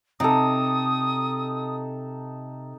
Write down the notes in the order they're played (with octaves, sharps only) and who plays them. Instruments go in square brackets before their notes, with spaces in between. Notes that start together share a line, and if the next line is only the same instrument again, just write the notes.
[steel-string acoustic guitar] C3 [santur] D#4 A4 [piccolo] D#6